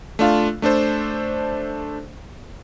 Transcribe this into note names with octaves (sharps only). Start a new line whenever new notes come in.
A3 D4 F4 F5
A3 D4 A4 C5